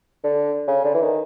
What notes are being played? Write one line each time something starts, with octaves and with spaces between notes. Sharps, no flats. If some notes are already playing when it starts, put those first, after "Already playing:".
D3
C#3
D3
E3
D#3